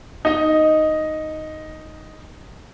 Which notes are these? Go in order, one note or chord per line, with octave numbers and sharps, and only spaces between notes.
D#4 D#5